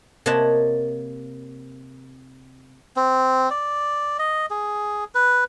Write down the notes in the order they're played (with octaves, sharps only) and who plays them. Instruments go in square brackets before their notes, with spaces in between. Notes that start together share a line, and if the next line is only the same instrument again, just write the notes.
[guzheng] C3 A#3 C#5 D#5 F#5 A5
[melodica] C4
D5
D#5
G#4
B4